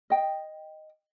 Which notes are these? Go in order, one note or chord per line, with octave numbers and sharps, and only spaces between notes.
D#5 G5